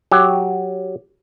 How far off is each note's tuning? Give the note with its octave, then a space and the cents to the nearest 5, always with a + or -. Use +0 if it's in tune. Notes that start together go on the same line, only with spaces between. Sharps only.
F#3 +0 G4 +5